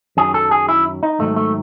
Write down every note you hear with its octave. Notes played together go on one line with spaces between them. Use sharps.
F#2 D#3 F#3 G#4
A4
G#4
E4
D#4
G#2 D#3 F#3 A3
A3